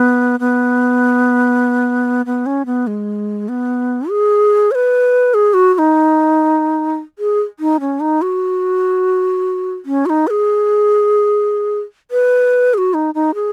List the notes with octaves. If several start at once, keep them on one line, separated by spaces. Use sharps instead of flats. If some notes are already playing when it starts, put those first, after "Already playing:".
Already playing: B3
B3
B3
C#4
B3
G#3
B3
G#4
C#5
B4
G#4
F#4
F#4
D#4
G#4
D#4
C#4
D#4
F#4
C#4
F#4
D#4
B4
G#4
B4
G#4
F#4
D#4
D#4
G#4